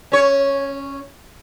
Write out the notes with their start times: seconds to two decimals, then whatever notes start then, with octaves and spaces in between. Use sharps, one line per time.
0.12 C#4 C#5